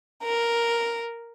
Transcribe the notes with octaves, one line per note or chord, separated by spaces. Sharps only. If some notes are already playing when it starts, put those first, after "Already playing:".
A#4